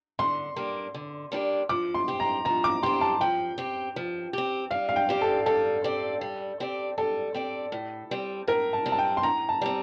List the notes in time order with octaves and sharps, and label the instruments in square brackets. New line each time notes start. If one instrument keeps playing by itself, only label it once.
[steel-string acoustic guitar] D3 [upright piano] C6
[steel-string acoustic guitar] G3 A#3 D4 G4
D3
G3 A#3 D4 G4
[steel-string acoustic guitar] F3 [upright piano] D6
[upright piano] C6
[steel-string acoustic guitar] C4 G4
[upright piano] A#5
[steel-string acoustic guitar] F3 [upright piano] A#5
[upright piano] D6
[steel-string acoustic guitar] C4 G4 [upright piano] C6
[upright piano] A5
[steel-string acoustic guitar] F3 [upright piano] G5
[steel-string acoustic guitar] C4 G4
F3
C4 G4
[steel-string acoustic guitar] G3 [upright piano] F5
[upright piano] F5
G5
[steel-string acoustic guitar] C4 G4 D5
[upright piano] A4
[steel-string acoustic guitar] G3 [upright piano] A4
[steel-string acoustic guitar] C4 G4 D5
G3
C4 G4 D5
[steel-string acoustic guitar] G3 [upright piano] A4
[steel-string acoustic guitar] C4 G4 D5
A2
G3 C4
[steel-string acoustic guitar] A2 [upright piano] A#4
[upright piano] A5
[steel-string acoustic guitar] G3 C4
[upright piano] A5
G5
C6
[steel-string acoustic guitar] A2 [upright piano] A#5
[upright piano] A5
[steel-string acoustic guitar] G3 C4